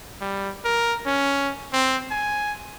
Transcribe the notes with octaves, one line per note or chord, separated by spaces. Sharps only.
G3
A#4
C#4
C4
G#5